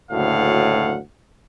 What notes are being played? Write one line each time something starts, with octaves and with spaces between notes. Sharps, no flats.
F#1 D2 A2 F#3 F5 F#5